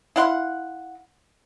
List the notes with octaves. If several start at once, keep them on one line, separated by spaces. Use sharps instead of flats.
E4 F5 F#5 C6